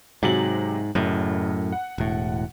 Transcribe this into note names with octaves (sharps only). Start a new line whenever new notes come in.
G#2 C3 F#3 F#7
F#1 F#2 A2
F#5
E1 A2